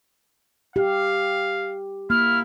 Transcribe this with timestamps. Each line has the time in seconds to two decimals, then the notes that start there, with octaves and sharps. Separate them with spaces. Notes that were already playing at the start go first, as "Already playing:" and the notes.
0.76 G4 F5
2.10 A#3 E4 F6